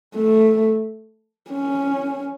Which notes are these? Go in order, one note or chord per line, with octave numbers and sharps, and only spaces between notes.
A3
C#4